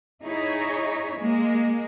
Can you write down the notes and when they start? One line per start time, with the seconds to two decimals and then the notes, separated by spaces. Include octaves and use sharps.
0.22 D#4 E4 G#4 C#5
1.18 G#3 A#3